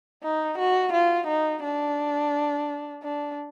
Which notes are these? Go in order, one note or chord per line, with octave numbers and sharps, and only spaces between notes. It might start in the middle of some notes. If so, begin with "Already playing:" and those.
D#4
F#4
F4
D#4
D4
D4